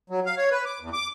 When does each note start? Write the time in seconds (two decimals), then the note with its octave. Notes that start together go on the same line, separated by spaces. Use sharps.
0.10 F#3
0.25 F5
0.37 C#5
0.51 B4
0.65 D6
0.80 E2
0.93 D6